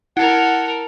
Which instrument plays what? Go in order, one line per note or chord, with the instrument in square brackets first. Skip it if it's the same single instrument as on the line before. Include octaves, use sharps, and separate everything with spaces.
[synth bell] E4 [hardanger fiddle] A4 A#4 [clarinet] F#5